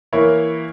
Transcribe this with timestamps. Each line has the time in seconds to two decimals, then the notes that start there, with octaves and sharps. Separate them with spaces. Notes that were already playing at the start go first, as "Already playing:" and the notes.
0.13 E3 A#3 E4 A#4 C#5